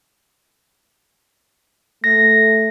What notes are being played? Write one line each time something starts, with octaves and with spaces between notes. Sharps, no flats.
A3 A#6